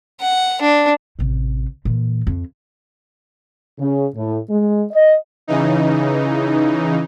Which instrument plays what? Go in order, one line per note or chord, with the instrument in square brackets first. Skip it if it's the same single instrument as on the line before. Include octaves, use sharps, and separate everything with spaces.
[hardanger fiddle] F#5
D4
[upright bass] A1 C3
A#2 E3
F2
[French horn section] C#3
A2
G#3
D#5
[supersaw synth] C#3 E3 D#4